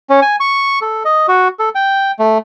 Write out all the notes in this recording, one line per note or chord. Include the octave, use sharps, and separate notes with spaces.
C#4
G#5
C#6
A4
D#5
F#4
A4
G5
A3